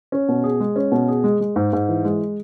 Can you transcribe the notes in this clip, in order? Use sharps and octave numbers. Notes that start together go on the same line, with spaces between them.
C#4
B2
G#4
G#3
C#4
B2
G#4
G#3
G#3
G#2
G#2
E3
G#3